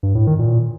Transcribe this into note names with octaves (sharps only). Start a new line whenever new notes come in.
G2
A2
D#3
A#2